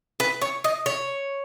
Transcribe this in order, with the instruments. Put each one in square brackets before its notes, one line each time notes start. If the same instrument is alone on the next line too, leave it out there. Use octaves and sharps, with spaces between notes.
[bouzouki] B4
C#5
D#5
C#5